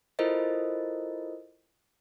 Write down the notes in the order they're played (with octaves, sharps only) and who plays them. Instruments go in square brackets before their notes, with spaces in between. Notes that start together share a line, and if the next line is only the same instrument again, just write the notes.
[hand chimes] E4 F4 A4 A#4 C5 D#5